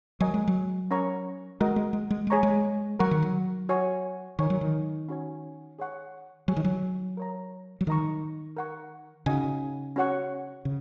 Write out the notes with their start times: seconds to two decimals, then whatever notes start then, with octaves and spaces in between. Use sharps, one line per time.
0.20 F#3 A#4 D#5 G#5 C#6
0.34 G#3
0.48 F#3
0.91 C#4 A#4 C#5 A#5 C#6
1.60 G#3 F#4 A#4 D#5
1.76 G#3
1.93 G#3
2.10 G#3
2.27 G#3
2.30 G#4 C#5 A#5 C#6
2.43 G#3
2.99 F#3 A#4 F#5 C#6
3.11 D#3
3.22 F#3
3.69 F#4 C#5 G#5 C#6
4.39 D#3 A#4 C#5 G#5 C#6
4.50 F#3
4.61 D#3
5.09 C#4 F#4 C#5 G#5
5.79 G#4 C#5 F#5 C#6
6.48 F#3 G#4 C#5 G#5 C#6
6.56 D#3
6.64 F#3
7.17 A#4 C#5 A#5
7.81 F#3
7.87 D#3 A#4 D#5 A#5 C#6
8.57 A#4 F#5 C#6
9.26 C#3 D#4 F#4 D#5 G#5
9.96 C#4 F#4 C#5 F#5 C#6
10.65 C#3